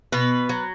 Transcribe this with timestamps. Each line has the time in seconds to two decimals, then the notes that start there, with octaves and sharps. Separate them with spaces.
0.12 B2 B3 B4
0.49 F#3